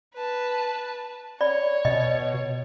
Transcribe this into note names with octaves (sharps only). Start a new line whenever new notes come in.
B4 A5
C#5 D5 B5
B2 D#5